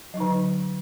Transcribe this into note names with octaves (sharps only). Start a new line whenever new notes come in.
D3 F#3 D#4